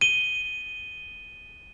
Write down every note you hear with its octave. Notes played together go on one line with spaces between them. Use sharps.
D#7 G7